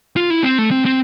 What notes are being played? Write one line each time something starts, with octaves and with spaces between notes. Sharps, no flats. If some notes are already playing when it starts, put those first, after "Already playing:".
F4
E4
C4
A3
C4
C4